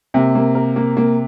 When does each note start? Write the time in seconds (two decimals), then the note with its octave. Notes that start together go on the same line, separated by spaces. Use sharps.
0.14 C3 A#3
0.35 A#3
0.55 A#4
0.76 A#3
0.97 A#3